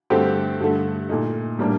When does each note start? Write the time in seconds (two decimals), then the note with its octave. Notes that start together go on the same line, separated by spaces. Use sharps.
0.10 G2 D3 A3 C4 G4
0.60 G2 D3 A3
1.09 A#2 A3 D#4
1.59 A2 G3 A#3 D4